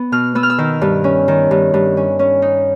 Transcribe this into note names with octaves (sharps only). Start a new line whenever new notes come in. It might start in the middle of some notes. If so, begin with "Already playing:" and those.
Already playing: B3
B2 F6
B3 E6
F6
E6
D#3
G2
C#4
D#3
G2
G2
C#4
C#4
D#4